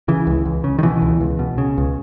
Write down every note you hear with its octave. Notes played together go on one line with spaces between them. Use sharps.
C#3 E3
C#2
C#2
C#3
D#3
B2 E3
C#2
C#2
B2
C#3
C#2